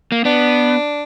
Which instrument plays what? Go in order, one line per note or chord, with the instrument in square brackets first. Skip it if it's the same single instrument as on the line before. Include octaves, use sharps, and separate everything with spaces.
[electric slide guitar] A#3
[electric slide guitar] B3 [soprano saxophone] D4